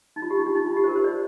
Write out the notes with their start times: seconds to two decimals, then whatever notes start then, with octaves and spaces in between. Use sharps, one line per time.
0.16 D#4
0.22 F4
0.30 G4
0.38 D#4
0.46 D4
0.55 D#4
0.66 F4
0.77 G4
0.84 C5
0.88 A#4
0.96 C5
1.04 D5